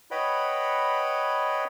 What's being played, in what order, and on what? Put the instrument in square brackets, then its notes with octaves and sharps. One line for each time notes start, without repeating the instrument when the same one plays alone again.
[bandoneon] B4 C#5 D#5 F#5 G5 B5